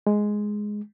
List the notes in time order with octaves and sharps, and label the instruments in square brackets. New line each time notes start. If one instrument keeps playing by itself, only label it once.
[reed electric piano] G#3